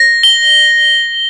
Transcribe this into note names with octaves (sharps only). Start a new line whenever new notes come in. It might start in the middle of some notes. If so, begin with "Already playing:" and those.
Already playing: A#6
G7